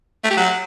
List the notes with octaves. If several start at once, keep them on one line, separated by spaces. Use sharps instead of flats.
A3
G4
F#3